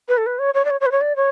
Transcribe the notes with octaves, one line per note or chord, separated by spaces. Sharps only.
B4
A4
B4
C#5
C#5
D5
C#5
C#5
B4
C#5
D5
C#5